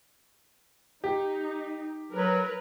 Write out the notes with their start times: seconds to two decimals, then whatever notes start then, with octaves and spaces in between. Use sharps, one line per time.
1.04 D#4 G4
2.12 F#3 A#4 B4